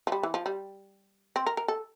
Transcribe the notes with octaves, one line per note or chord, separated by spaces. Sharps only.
F3
G3
E3
F3
G3
C4
A#4
A#4
A4